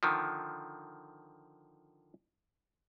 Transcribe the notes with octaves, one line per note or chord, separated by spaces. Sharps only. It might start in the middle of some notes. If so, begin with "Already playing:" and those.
D3 D#3 F3